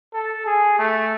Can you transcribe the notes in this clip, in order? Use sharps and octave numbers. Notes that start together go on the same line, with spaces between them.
A4
G#4
A3